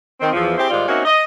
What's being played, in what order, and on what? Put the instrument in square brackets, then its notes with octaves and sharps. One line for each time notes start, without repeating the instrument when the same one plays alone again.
[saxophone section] D#3 C4
E2 F3
C4 E4 G4 G#4 C5
G#2 D#3 G3 F4 D5
A#3 C4 C#4 D#4 F#4 E5
D#5